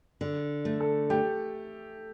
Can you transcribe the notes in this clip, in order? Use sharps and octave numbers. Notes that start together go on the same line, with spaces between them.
D3
A3
A4
A3 G4